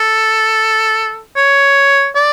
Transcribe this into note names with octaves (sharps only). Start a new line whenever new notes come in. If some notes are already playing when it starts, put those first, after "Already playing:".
Already playing: A4
C#5
D5